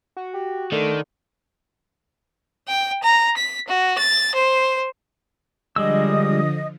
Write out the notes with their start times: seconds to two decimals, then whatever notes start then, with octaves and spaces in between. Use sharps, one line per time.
0.17 F#4
0.34 G4
0.72 D3 D#3 A3
2.68 G5
3.03 A#5
3.37 B6
3.68 F#4
3.98 A6
4.35 C5
5.76 D3 F3 G3 G#3 D#5 D#6 E6